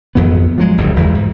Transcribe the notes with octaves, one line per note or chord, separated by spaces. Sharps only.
G#1 F2 E3 B3
F3 F#3 G#3
F#1 D2 G2
G1 E2 E3 G#3
G#2